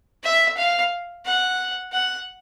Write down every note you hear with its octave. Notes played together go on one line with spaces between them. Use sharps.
E5
F5
F#5
F#5